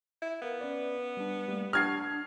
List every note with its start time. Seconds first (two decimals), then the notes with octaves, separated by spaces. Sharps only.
0.22 E4
0.42 B3 A#4 F5
0.61 C#4 B4 D5
1.17 G3 D4
1.48 G3 A3 A#3
1.73 D4 F#5 C#6 F6 G#6 C7